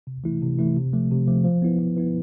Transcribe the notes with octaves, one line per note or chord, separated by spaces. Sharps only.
C3
E3 A3 E4
C3
E3 A3 E4
C3
F3 A3
C3
F3 A3
F3
B3 E4 B4
F3
B3 E4 B4